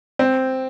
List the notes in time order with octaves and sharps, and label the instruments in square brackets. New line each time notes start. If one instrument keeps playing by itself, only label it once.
[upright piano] C4